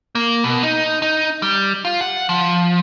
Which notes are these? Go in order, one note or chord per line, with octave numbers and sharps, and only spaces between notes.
A#3
B2
D#4
D#4
G3
F4
F#5
F3